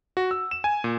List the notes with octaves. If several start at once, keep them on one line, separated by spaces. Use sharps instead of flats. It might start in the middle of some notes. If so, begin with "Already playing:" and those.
F#4
E6
E7
G#5
A#2